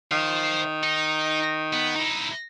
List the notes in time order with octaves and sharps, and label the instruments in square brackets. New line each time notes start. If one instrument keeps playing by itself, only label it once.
[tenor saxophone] D#3 [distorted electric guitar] C5 F5
[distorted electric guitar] D#4
B3
D#4 E4